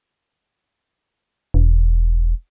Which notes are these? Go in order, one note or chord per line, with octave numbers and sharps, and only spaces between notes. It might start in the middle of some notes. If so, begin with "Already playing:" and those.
E1